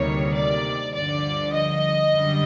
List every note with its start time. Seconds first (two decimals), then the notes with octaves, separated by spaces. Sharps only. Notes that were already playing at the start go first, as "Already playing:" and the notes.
Already playing: D2 C3 D#3 G3 A#3 C#5
0.35 D5
0.94 G2 D3 F3 D5
1.54 D#5
2.13 F#2 D3 G3